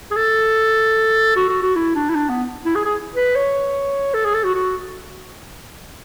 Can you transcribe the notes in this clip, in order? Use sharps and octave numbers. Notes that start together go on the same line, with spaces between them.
G#4
A4
F#4
F#4
F#4
E4
D4
E4
D4
B3
E4
G#4
G#4
B4
C#5
A4
G#4
A4
F#4
F#4